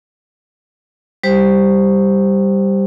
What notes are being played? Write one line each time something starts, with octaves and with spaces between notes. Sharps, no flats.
G3 G4 C5